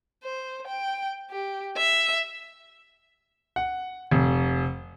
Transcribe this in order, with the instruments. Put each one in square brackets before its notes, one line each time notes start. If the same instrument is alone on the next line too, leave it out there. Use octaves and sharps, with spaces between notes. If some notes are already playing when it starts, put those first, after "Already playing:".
[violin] C5
G5
G4
E5
[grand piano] F#5
F1